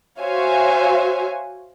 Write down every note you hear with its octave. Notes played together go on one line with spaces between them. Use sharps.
F#4 C5 C#5 E5 F5 G#5